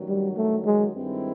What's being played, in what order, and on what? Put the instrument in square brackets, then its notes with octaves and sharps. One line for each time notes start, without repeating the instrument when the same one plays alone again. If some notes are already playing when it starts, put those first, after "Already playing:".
Already playing: [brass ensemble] A1 G2 D#3 F#3
[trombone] G3
A3
G#3
[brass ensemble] G2 D#3 G#3 C4 E4